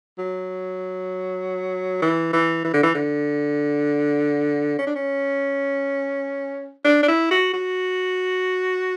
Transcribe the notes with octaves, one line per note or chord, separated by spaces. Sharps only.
F#3
E3
E3
E3
D3
E3
D3
C#4
D4
C#4
D4
D4
E4
F#4
F#4